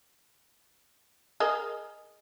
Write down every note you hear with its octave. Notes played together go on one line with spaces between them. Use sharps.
G#4 A#4 D#5